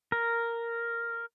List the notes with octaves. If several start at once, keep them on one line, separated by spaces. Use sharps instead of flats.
A#4